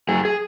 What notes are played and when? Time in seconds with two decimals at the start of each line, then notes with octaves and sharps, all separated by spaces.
0.08 F#2 G#4
0.25 G#4